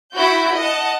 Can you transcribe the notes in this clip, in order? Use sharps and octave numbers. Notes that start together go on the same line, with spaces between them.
E4 F#4 F#5 G6
D#5 F#5 A5